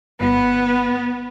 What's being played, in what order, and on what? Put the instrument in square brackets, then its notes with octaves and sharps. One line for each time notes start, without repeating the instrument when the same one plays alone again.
[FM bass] G1 [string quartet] B3 [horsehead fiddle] B4